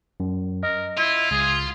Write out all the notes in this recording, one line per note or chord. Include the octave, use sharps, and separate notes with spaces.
F#2
A#4 D#5
E4 F4
C#2 G#4